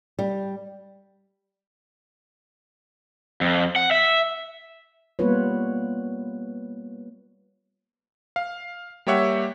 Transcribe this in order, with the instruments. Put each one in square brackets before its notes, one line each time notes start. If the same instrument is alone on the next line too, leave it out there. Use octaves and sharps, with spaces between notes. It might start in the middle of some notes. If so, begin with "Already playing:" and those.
[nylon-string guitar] G3
[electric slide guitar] F2
F#5
E5
[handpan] G3 A#3 B3 F4 B4 C#5
[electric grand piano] F5
G3 A#3 G4 C#5 E5 F#5